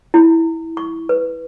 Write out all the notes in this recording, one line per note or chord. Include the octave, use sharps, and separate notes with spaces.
E4
C#6
B4